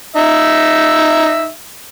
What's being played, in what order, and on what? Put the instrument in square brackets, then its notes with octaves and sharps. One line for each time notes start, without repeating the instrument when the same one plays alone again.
[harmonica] D#4 E5